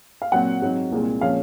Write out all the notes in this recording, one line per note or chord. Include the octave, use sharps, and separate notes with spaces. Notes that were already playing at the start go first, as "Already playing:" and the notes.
F5
A#2 F#3 C4 F#5
G#2 F#3 C4
C2 A#2 G#3 C4
A#2 F3 G#3 C#4 F5